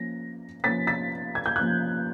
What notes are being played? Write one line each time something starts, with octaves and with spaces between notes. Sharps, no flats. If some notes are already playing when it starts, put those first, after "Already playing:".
Already playing: F3 A#3 C#4 A#6
F3 A#3 C#4 A6 B6
A6 B6
G#6
G6
F3 A#3 C#4 F#6 G#6